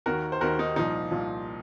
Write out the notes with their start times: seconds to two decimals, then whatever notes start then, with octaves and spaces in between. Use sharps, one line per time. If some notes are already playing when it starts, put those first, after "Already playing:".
0.06 D#2 D#3 F#4 A#4
0.32 C5
0.41 D#2 F#4 A#4
0.44 D#3
0.59 D#4
0.76 C2 A#2 F3 D#4
1.11 C2 A#2 F3